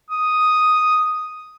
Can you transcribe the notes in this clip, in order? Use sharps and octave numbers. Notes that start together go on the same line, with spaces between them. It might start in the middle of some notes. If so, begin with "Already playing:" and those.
D#6